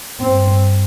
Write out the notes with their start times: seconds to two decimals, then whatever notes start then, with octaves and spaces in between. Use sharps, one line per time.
0.21 G2 C4